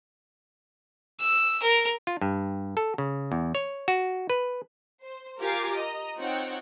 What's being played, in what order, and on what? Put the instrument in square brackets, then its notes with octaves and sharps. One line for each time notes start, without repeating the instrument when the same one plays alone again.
[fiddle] E6
A#4
[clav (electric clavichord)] F4
G2
A4
C#3
E2
C#5
F#4
B4
[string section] C5
F4 G4 A#4 F5 G#5 D6
D#5 A#5
C4 D#4 F4 C#5 F#5 G5